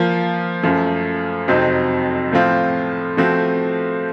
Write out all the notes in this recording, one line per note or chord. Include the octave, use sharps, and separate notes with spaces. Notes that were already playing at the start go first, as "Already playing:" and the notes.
Already playing: F3 A#3 F4
F#2 F3 A3
F2 C3 F#3 C4 D#4
A2 F3 A3 C4 F4
F3 A3 C4 F#4